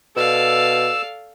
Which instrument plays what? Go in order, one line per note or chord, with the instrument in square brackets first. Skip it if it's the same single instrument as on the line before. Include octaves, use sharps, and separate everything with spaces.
[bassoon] B2 [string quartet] A4 D5 F5 [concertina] E6